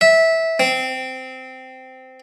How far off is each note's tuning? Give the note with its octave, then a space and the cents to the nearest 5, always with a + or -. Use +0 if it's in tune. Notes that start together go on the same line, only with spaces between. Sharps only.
E5 -15
C4 -15